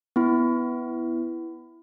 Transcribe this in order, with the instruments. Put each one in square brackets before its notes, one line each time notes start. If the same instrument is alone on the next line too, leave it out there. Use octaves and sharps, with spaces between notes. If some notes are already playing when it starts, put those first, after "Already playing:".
[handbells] B3 E4